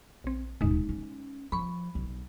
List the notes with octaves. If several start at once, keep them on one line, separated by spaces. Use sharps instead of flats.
A#1 C4
D#1 B2 G#3 D#4
C#4
F3 B5 C#6
B1